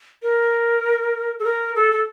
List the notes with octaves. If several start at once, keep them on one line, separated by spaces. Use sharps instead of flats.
A#4
A4
A#4
A4
A4